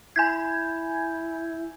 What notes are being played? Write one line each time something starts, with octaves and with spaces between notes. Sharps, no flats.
E4 G#5 G6 G#6